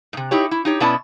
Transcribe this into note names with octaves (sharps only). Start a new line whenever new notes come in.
G#2 C3
D#4 E4 G4 C#5
E4
D#4 G4 C#5
B2 B3 C#4 E4 D5 A5